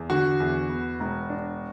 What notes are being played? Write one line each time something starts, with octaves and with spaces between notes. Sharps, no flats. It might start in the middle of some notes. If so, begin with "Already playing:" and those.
Already playing: E2
D3 F#4
E2
B3
E1
D4